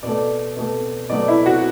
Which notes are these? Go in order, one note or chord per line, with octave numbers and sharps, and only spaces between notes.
B2 A3 D5
B2 A3
B2 F#3 A3 D5
E4
F#4